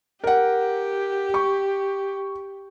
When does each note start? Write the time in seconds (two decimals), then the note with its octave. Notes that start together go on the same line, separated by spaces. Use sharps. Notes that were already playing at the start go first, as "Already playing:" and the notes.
0.24 G4 A#4 F#5
1.34 C#6